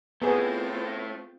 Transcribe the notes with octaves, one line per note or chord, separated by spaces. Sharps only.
A3 B3 C4 E4 F4 G#4